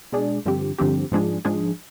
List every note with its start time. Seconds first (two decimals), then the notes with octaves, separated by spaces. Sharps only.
0.12 B2 G#3 D4 G#4 D5
0.46 G2 D3 F3 C4 G4
0.78 G2 D3 F3 C4 G4
1.12 G#2 F3 G#3 D4 G#4
1.45 G#2 F3 G#3 D4 G#4